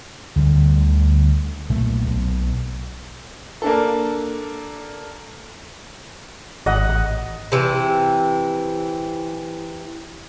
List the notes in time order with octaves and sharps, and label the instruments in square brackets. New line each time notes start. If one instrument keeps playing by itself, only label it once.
[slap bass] D2 D3 G3
B1 A#2 A3
B1
[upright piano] A#3 D4 A4
[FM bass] G#1 [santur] D#5 F#5
[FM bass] A1
[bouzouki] C3 E3